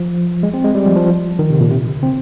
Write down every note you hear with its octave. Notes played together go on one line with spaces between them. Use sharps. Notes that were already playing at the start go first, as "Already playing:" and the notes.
Already playing: F3
G#3
C4
G#3
G3
F3
F3
D#3
C3
A#2
C3
D3
C4